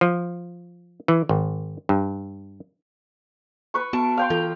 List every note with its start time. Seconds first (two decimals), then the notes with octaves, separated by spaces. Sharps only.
0.01 F3
1.08 E3
1.29 G#1
1.89 G2
3.74 B4 C#6
3.93 B3 F#4 A5 D7
4.17 F5 G5 C6
4.30 E3 F4 A4 G6